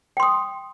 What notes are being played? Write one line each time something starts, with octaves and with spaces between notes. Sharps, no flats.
G5 C6 D#6